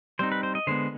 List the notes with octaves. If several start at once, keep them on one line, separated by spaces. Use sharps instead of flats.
G3 C4 D#4 C5
B4
C5
D#5
D3 G#3 B3 C5